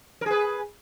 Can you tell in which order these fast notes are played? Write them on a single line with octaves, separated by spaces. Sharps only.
A#4 G#4 B4